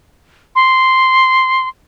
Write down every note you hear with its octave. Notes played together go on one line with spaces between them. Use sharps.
C6